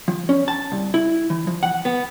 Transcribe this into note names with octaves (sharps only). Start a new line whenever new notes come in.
F3
C#4
A5
C2
E4
E3
F3
F#5
B3